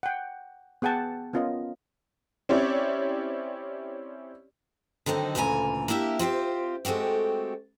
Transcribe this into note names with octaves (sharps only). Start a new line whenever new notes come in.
F#5 G5
B3 G#4 F#5 G5 A5
B3 C#4 F4 A#4 D#5
C4 C#4 E4 G4 C#5 D5
D3 D#3 F#3 C4 D#4
D2 A#2 C#3 E3 G#5 A#5
A#3 D4 E4 G4 E5
C4 F4 G4 C5
G#3 A3 C4 F#4 G4